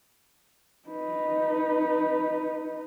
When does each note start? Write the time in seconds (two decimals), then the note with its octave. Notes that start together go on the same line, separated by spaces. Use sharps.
0.89 D#4 B4